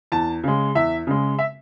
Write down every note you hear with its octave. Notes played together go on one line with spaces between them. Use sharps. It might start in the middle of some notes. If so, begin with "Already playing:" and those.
E2 A5
C#3 G#3
E2 E5
C#3 G#3
E5